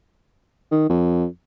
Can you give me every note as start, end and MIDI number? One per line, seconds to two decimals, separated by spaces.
0.72 0.87 51
0.89 1.26 41